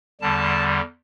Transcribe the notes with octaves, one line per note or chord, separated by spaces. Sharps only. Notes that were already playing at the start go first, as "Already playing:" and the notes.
E2 D3 G3 A5